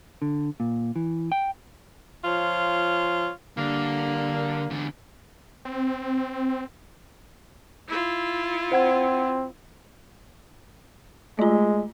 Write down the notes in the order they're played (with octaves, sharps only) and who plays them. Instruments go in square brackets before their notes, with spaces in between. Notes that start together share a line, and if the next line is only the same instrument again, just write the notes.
[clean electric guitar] D3
A#2
E3
G5
[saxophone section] F3 F4 C#5
[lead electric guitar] D3 [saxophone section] G3 A#3
[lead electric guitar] E2 D3
[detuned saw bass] C4
[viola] E4 F4
[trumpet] C4 [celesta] C5 F#5 G#6
[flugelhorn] G#3 [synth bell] A3 F4